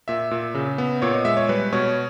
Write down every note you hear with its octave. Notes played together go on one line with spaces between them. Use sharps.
A#2 E5
A#2
C#3
B3
A#2 C#5
D#5
G#3 E5
C#5
G3 B4
B2 C#5